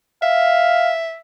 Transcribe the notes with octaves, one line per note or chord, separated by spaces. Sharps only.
E5 F5